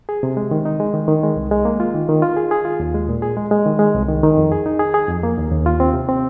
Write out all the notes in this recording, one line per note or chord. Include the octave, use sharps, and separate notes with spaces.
G#4
C3
G#3
D#3
D#4
G#3
D#3
D#3
G#3
C2
G#3
A#3
F4
D#3
D#3
F4
G#4
G#4
F4
D#2
G#3
A#2
G#4
G#3
G#3
D#3
G#3
C2
D#3
D#3
F2
G#4
D#4
G#4
G#4
F2
A#3
D#2
D#2
F4
C4
C3
C4